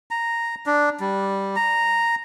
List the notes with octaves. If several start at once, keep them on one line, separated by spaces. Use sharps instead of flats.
A#5
D4
G3
A#5